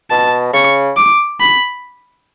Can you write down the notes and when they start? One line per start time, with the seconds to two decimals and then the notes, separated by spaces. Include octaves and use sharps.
0.10 B2 A5
0.53 C#3 C#6
0.97 D6
1.40 B5